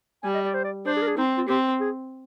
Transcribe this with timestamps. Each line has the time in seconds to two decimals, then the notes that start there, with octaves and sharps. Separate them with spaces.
0.23 G3 G#5
0.35 D#5
0.45 D5
0.54 C5
0.64 D5
0.86 D4 C5
0.97 G#4
1.02 A#4
1.07 G#4
1.17 C4 D#4
1.38 F4
1.48 C4 G4
1.80 G#4